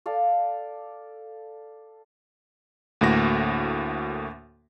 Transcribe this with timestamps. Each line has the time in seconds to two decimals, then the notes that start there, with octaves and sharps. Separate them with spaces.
0.06 A4 D5 F5
3.01 D2 A2 A#3 F#4 A#6